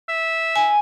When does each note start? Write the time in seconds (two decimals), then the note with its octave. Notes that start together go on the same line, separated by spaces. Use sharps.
0.09 E5
0.56 G#5